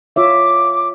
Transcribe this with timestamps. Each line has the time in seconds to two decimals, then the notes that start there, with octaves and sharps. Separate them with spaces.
0.16 F4 C#5 E5 D6